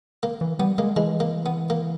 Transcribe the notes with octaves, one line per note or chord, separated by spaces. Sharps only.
A#3
E3
G3 B3
G#3 A#3
E3 G#3
A#3
B3
A#3